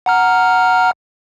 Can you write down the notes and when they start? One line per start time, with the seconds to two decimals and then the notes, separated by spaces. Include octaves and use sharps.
0.06 F#5 A#5 F6